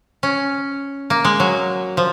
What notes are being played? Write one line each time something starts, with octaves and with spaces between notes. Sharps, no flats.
C#4
A#3
G#3
F#3
F3